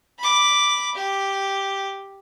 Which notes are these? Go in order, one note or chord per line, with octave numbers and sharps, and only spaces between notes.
B5 D6
G4